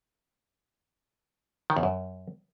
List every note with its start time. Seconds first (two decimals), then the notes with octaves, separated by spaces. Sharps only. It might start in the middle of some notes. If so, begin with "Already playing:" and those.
1.70 D#3
1.76 E2
1.83 F#2